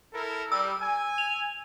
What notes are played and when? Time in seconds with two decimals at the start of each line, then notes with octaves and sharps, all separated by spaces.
0.13 E4 A4 A#4
0.52 G3 E6
0.81 G#5
1.18 F7